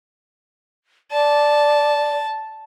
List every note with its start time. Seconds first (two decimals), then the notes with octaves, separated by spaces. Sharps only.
1.12 D5 A5